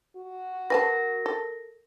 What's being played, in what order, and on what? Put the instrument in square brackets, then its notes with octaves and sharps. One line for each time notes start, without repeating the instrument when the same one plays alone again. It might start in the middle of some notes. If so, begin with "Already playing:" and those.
[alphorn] F#4
[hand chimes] A#4 A#6 [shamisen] B4 G#5 A5
[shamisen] A4